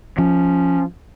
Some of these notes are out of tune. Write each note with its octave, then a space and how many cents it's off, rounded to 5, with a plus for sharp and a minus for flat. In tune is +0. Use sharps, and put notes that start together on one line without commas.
F3 +0 C#4 +0